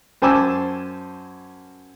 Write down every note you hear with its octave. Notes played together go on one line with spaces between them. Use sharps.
F#2 C5 G#5 A5 D6 E6